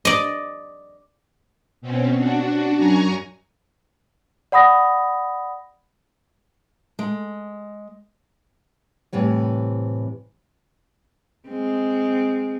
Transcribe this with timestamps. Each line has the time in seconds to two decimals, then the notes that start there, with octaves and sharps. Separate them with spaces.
0.05 D5 D#5
1.82 B2 C4 C#4
2.15 D4 F#4
2.78 F#2 G#5 A#5 C#6
4.52 D5 F#5 B5 D#6 A#6
6.99 G#3
9.13 A2 C3 E3 G3
11.48 G#3 C4